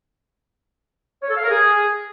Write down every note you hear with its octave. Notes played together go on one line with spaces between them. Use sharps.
C#5
A4
F5
A#4
G#4